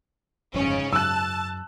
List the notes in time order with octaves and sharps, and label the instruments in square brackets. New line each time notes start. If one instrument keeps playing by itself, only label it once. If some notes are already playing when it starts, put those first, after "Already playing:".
[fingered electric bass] G1 F2 [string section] G#2 C#3 C#4
[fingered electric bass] F#2 [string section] A5 [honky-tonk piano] E6 F#6